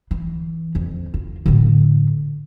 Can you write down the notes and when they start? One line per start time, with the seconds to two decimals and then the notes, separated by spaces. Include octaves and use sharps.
0.11 E3
0.75 F2
1.14 F4
1.46 A2 D3